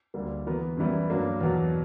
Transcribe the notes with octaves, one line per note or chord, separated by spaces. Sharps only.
D2 D3 G3 A#3
E3 B3 F#4 A#4
F#2 E3 G3 B3 E4
G2 F#3 A#3 D4
E2 B2 F#3